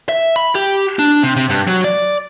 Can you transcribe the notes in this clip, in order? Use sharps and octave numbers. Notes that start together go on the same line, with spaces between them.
E5
B5
G4
D4
C3
C3
G2
F#3
D5